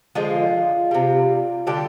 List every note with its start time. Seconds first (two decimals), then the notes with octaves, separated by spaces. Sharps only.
0.15 D3 F3 G#3 F4
0.91 C3 G3
1.67 D3 G3 G4